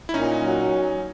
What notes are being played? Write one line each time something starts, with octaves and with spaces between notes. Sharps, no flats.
E4
A#2 C#4 D#4
F#3